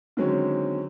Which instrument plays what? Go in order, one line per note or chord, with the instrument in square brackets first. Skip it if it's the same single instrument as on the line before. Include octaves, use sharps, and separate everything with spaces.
[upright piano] D3 D#3 F#3 G#3 C4 C#4